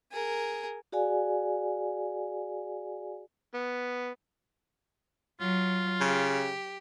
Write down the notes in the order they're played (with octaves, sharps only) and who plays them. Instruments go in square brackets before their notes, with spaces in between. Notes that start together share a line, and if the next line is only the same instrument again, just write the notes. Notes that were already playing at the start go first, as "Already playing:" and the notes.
[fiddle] G#4 A#4
[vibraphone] F#4 G#4 D5 F5 G#5
[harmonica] B3
[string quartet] F#3 [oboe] F4
[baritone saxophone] C#3 [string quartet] G4